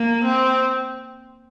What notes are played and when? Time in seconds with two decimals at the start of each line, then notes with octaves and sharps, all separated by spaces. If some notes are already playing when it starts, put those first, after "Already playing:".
Already playing: A#3
0.24 C4